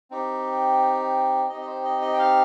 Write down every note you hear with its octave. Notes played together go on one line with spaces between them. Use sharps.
C4 D#4 G4
C4 D#4 G4 D#5
D#5
C5
D#5
D#5
G5
F5